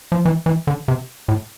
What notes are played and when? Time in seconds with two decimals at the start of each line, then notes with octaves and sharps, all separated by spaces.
0.12 F3
0.25 E3
0.46 E3
0.67 D3
0.88 C3
1.28 A2